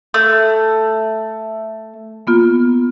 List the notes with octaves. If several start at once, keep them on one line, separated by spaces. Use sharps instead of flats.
A3
A#3 B3 F4